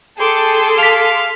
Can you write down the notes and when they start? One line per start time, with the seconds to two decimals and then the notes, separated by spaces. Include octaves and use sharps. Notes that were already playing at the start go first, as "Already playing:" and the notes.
0.18 G#4 A4 G5 C6 D6
0.79 F5 B6 F7